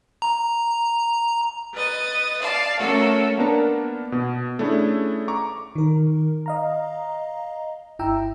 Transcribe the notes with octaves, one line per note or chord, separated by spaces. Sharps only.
A#5
B4 D#5 A6
D5 F5 A5
A3 C#4 F#4 A4 A#4
A#3 B3 D4 A#4 A5
B2
A3 C#4 D4 E4 G#4
A#5 C#6 D6
D#3 A#4
D#5 F5 A#5
G1 E4 E5 G5 A#5 E6